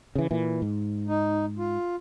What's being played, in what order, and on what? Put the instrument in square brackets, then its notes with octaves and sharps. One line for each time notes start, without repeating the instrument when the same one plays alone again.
[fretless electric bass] C#3 E3
A#2 E3
G#2
[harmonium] D#4
F4